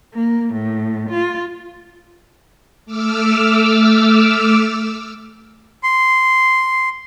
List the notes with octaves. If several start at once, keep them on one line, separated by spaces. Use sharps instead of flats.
A#3
A2
F4
A3 D6 E6 F6
C6